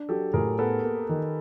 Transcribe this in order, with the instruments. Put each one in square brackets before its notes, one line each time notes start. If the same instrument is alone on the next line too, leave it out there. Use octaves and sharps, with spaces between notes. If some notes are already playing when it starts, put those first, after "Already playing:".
Already playing: [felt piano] D4
[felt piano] F#3 [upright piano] G4 A4
[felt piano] A2 [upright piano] G#4 A#4
[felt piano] B3 [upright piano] A4 B4
[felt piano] A#3
D#3